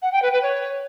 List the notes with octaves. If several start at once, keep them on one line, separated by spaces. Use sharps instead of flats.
F#5
G5
B4
B4
C#5